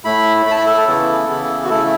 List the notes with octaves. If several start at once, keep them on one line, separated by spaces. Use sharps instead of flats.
A2 A3 E4 B5
A2 A3 E4 B5
A5
B5
A4
A4
C#3 E3 B3 E4
C#3 E3 B3 E4
F#4
C#3 A3 E4 A4